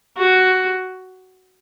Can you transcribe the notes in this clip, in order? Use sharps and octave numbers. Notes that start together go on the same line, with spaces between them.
F#4